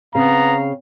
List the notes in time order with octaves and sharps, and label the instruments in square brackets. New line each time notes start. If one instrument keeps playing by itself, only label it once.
[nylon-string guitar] C#3 C4 [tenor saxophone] B3 [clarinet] F5 [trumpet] A#5